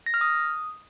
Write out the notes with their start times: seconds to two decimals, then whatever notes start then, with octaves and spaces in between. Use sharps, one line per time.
0.06 A#6
0.14 F6
0.21 D#6